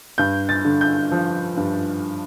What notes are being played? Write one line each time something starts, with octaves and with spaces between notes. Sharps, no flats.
G2 G6
A6
D3
G6
F3
G2